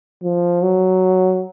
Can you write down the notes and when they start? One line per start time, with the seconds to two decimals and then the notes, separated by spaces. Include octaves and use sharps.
0.24 F3
0.63 F#3